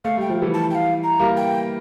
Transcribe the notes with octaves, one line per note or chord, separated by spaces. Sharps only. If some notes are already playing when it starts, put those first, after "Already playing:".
A3 F5
G3 G5
F3
E3 G3
A5
G5
F5
A#5
G3 A#3
G5